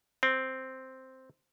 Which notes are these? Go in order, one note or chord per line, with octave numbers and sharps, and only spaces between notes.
C4